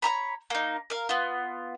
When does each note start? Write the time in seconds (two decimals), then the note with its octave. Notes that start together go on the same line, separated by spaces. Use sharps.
0.02 C#5 E5 A#5 B5
0.50 A#3 D#4
0.90 A#4 F5
1.09 B3 F4